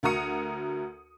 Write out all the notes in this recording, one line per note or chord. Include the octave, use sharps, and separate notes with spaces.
D2 F#4 A#4 A#5 D#6 C#7